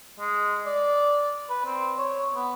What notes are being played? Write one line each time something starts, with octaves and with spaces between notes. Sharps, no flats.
G#3
D5
B4
C4
C#5
B3